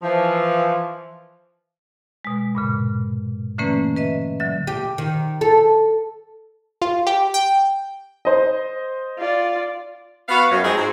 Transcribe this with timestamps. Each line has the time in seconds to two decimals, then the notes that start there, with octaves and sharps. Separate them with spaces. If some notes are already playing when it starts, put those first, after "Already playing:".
0.03 E3 F3
2.25 B2 G#3
2.55 G2 A#2 C#3
3.58 D3 E3 A3 A#3 C#4 B4
3.96 B4 D#5 E5
4.40 D3 F#3 E5
4.67 G4
4.98 D#3
5.41 A4
6.82 F4
7.07 G4
7.34 G5
8.25 C5 D#5
9.19 F4 D5
10.28 B3 F#4 F5
10.51 F#2
10.63 F3 G#3 C4 D#4 F#4 G#4
10.76 G#2 C4